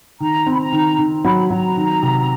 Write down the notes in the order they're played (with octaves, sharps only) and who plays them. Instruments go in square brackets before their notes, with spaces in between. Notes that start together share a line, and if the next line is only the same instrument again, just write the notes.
[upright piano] D#3 [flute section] A#5
[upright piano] C4
[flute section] B5
A#5
[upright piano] D#3
D#3
[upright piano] F#3 [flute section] B5
[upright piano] F#3 [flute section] A#5
[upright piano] D#3
C3